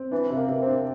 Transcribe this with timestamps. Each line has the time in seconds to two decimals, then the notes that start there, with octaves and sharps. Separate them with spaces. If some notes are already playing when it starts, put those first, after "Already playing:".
Already playing: C4
0.11 E3 D4
0.30 C3
0.37 A#3
0.48 C3
0.61 C4
0.67 D4